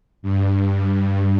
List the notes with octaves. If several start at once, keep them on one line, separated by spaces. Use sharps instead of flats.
G2
G2